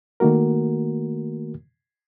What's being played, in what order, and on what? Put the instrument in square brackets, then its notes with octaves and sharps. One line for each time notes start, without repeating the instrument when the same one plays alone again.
[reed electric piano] D#3 A3 A#3 F#4 A#4